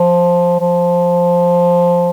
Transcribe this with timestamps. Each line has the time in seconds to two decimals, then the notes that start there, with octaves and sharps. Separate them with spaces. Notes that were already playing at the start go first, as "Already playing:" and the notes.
Already playing: F3
0.60 F3